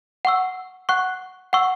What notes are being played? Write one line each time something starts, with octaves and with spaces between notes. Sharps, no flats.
F#5 C#6 E6
F#5 C#6 F#6
F#5 C#6 E6